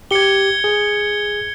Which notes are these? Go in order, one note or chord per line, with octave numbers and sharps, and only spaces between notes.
G4 G#6 C#7 G7
G#4